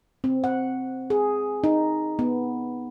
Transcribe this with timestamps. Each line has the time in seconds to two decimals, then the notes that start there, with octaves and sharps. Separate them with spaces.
0.24 C4
0.44 F#5
1.10 G#4
1.64 D#4
2.19 B3